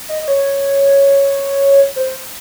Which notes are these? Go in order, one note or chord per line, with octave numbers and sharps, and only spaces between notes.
D#5
D#5
C#5
C5